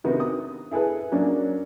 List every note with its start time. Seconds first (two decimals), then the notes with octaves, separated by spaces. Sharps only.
0.04 C3 D#3 B3 F#4
0.20 D#6
0.71 E4 G#4 A4 B4
1.12 F#3 A#3 C#4 D4